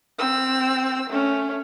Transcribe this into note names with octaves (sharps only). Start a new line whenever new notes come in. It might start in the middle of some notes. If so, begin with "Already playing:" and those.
C4 E6
A3 C#4